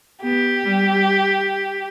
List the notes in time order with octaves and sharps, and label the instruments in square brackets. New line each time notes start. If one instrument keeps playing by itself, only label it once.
[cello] B3 [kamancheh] G4
[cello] G3